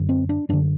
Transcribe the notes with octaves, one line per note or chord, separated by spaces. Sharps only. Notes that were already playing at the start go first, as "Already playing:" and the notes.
Already playing: F#2 D3
C4
D4
F#2 D3 D4